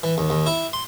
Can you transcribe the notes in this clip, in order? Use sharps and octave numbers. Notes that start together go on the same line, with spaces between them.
E3
D#2
D#2
E4
C6